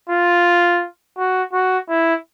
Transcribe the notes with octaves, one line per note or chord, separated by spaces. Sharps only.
F4
F#4
F#4
E4